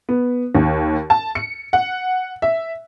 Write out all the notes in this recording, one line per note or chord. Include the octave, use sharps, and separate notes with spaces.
B3
D#2
A5
C#7
F#5
E5